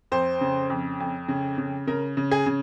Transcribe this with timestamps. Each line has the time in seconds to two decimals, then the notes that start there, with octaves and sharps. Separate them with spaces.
0.12 F2 C5
0.41 C#3
0.70 F2
1.00 F2
1.28 C#3
1.58 C#3
1.87 C#3 A#4
2.17 C#3
2.31 G#4
2.46 C#3